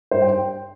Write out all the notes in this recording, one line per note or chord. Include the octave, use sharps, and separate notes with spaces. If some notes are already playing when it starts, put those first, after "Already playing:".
G2 C5
G5